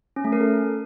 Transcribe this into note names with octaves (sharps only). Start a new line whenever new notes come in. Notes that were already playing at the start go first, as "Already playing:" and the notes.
C#4
A3
A#4
A4